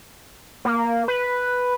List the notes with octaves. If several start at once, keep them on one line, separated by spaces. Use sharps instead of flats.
A#3
B4